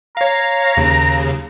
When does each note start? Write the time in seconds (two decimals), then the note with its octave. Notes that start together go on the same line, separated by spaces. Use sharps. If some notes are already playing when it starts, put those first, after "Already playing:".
0.17 C#5 F5 A#5
0.77 D#2 C#3